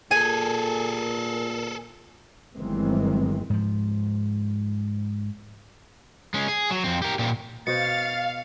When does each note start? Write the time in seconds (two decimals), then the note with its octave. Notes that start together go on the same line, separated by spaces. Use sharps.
0.11 A#2 G#4 A4 G#5
2.54 G1 D#3 E3 F#3 G#3 C4
3.50 G#2 F3
6.34 G#3 C#4
6.48 G#4
6.71 F#3
6.84 F2 C4
7.02 G4 A#4
7.19 A#2 G4
7.67 B2 F#4 C5 F5 A6 C#7